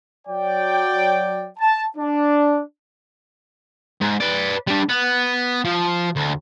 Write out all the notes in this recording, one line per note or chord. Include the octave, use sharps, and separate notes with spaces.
F#3 D5 G5
A5
D4
G#2
B4 D5
G3 D4
B3
F3
D2